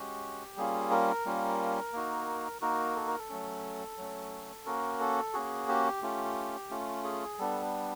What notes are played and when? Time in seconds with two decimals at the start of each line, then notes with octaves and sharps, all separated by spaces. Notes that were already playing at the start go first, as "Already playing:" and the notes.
Already playing: G#3 C#4 F#4 G4
0.57 G3 A#3 C#4 F4 G#4
0.91 A#4
1.25 G3 A#3 C#4 F4
1.93 A#3 D#4 F#4
2.61 A#3 D#4 F#4 A#4
2.96 A4
3.08 A#4
3.19 A4
3.29 F#3 A3 C#4
3.97 F#3 A3 C#4
4.66 A#3 C#4 F#4 A#4
5.00 A4
5.34 A#3 C#4 F#4 G#4
5.69 G4
6.02 A3 C#4 F4
6.70 A3 C#4 F4
7.04 G#4
7.38 G3 B3 D4 A4